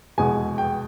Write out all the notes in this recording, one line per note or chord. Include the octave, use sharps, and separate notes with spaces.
F1 E2 B2 G#3 G#5
G5